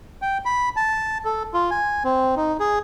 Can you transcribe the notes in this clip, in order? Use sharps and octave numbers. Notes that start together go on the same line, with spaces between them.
G5
B5
A5
A4
F4
G#5
C4
D#4
G#4